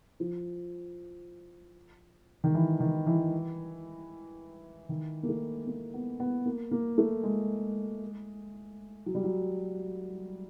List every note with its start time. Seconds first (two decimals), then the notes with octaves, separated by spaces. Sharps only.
0.20 F3
2.44 D#3
2.55 E3
2.80 D#3
3.07 E3
4.89 D#3
5.23 A#3
5.29 A3
5.67 A#3
5.94 B3
6.20 B3
6.46 A#3
6.71 A#3
6.98 A3
7.23 G#3
9.06 F#3
9.15 G3
9.24 F#3